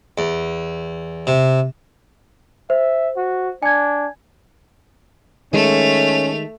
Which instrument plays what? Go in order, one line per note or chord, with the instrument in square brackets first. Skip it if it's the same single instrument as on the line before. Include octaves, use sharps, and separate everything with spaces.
[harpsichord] E2
C3
[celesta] C5 [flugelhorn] E5
[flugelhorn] F#4
[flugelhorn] D4 [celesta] G#5 G#6
[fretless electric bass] D#3 G#3 [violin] A3 F7 [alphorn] C#4